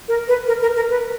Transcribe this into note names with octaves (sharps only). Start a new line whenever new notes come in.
A#4
B4
A#4
A#4
A#4
B4